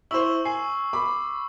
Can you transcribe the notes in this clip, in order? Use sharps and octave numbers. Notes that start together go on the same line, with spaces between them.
E4 C5 C#6 E6 F#7
G#5 C7
B5 D6